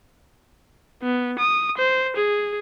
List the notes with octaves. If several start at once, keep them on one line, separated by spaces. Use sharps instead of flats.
B3
D#6
C5
G#4